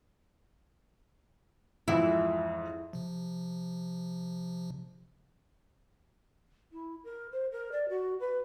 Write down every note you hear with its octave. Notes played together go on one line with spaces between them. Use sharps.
F2 G#2 E3 E4
C3 F3
E4
A#4
C5
A#4
D5
F#4
B4